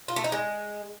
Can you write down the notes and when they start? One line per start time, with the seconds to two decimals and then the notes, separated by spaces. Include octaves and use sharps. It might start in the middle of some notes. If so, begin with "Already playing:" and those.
0.08 F4
0.16 A3
0.24 D#4
0.32 G#3